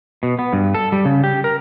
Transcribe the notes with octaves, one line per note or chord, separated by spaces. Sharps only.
B2
B3
G2
A4
G3
C#3
G4
A#4